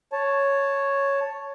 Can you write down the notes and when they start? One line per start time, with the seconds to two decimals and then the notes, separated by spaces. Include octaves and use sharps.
0.13 C#5 A5